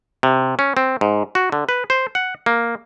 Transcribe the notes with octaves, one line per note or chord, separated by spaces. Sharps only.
C3
C#4
C4
G#2
F#4
D3
B4
C5
F#5
A#3